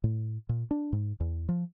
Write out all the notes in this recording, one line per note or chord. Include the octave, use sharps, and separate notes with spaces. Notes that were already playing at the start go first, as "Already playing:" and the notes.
A2
A#2
D4
G#2
E2
F3